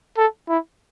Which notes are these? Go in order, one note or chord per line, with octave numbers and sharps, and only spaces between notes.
A4
E4